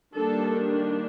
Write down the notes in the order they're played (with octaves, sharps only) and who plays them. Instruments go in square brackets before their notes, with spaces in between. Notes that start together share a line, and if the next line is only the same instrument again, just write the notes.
[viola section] D#3 G3 A#3 D4 A4